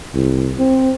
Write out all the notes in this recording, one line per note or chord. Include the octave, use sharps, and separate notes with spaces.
C2
C4